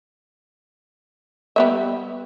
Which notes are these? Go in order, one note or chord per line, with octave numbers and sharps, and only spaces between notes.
G3 B3 E5